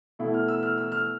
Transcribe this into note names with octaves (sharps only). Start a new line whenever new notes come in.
B2 A3 E4
F6
E6
F6
E6
F6